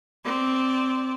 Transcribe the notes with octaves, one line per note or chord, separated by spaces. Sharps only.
C4 D5